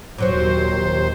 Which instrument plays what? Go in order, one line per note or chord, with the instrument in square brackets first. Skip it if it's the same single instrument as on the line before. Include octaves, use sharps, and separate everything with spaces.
[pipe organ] D#2 C5 [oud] A#2 F#3 C4